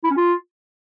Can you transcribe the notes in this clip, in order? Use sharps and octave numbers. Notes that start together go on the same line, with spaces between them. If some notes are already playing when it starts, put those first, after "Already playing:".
E4
C#4
F4